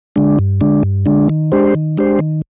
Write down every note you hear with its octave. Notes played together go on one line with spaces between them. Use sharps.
D3 G#3 D4
G2
D3 G#3 D4
G2
D3 G#3 D4
D#3
G#3 D4 G4 C5
D#3
G#3 D4 G4 C5
D#3